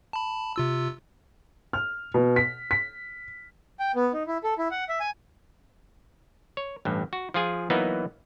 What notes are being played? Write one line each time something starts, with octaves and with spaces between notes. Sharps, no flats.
A5 B5
C3 F4 E6
F6
B2
B6
B6
G5
B3
D#4
E4
A4
E4
F#5
E5
G#5
C#5
A1 G2
F#4
F3 F4 G#4 G#5
E3 F#3 A#3 B3 D#4